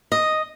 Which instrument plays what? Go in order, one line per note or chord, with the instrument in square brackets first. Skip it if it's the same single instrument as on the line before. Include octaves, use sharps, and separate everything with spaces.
[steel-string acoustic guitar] D#5